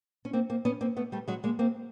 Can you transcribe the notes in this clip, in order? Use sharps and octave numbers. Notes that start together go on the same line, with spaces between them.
C#4
A#3 C4
A#3 C4
B3 C#4
A#3 C4
A3 B3
G3 A3
F#3 G#3
G#3 A#3
A#3 C4